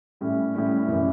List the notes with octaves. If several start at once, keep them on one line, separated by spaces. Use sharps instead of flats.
A2 G3 C#4 E4
A2 G3 C#4 E4
F#1 C#3 E3